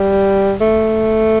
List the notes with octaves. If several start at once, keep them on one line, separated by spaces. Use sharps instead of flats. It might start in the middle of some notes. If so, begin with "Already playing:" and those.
Already playing: G3
A3